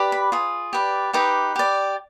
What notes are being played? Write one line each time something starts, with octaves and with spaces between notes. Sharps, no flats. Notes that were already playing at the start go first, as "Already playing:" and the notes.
Already playing: G4 B4 D5
B5
F4 G#4
G4 B4 D5
D#4 G4 B4 D6
G4 D5